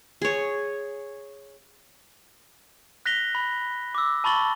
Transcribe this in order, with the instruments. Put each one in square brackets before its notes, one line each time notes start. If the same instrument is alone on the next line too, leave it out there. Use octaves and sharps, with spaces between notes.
[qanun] G#4 C#5
[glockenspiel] F#6 A#6 B6 F7 G7
B5
D6 E6
A5 B5 C#6 A6 F#7 G7